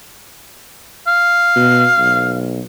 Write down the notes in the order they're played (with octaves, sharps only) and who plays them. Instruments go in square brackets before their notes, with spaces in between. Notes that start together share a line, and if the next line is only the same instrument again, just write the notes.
[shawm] F5
[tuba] B2
B1